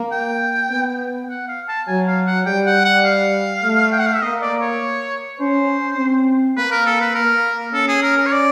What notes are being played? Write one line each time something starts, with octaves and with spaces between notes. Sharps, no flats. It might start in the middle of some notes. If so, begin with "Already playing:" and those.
Already playing: A#3
G5
B3
F#5
F5
A5
F#3 G#5
F5
F#5
G3 G5
F#5
F#5
F5
A3
G5
F#5
F5
E5
A#3 D#5
D5
C#5
C#4 C5
C4
A#3 B4
A#4
A4
B4
A#3 A#4
C#4 A4
G#4
A#4
A#4
C#5
D5